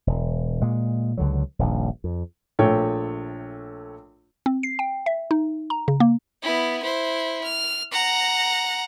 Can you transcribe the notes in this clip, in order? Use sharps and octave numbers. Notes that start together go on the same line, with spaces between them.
E1
A#2 G#3
C#2 D3 F#3
D#1 A#1 G2
F2
A#1 A3 C#5 G5
C4
C7
G5
E5
D#4
A#5
C#3
A#3
B3 E4
E4 C5
F6
F#5 A#5